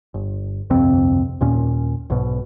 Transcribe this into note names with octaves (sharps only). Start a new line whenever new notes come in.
G1
G1 C2 F2 C4
D#2 A#2 C#4
B1 G#2 B2